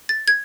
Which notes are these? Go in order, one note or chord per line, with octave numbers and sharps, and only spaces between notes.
A6
G#6